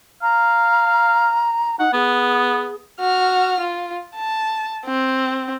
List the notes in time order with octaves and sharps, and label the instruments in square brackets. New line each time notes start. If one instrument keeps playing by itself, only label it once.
[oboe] F5 [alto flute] A#5
[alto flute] D#4 [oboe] F#5
[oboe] B3 [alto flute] G#4
[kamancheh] F#4 F6
F4
A5
C4